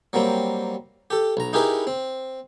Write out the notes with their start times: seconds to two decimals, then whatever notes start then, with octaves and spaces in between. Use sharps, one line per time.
0.13 F#3 G3 A#3 C4
1.10 G4 A4
1.37 B1 A#5
1.53 D#4 E4 G4 G#4 A#4 B4
1.87 C4